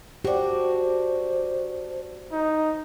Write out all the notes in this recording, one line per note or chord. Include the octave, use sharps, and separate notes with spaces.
D4 F#4 G4 C5
D#4